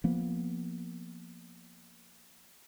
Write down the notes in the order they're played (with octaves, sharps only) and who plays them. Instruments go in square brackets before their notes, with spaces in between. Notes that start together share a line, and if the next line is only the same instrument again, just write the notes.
[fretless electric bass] F3 A#3 B3